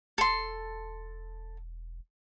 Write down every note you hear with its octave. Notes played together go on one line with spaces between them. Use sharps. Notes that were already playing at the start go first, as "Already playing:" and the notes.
E1 A4 C6